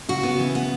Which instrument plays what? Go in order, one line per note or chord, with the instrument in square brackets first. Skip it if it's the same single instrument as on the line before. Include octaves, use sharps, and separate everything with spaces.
[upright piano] C#3 [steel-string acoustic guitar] F#4
[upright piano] C#3 [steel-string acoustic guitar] B3
[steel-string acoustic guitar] E3
B3